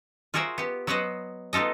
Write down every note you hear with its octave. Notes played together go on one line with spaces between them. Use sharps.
F4 F#4 G#4 A#4 C5 E5
B3 G4
F#3 B3 B4 C5 D#5 F#5
B3 D#4 F4 A4 D#5